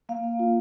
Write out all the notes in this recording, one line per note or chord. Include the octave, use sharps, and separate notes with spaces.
A#3 F5
A#3
F4